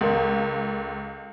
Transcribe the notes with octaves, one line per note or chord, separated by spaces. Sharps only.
C#2 A4 A#4 F5